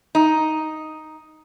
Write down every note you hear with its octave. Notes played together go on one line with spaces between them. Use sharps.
D#4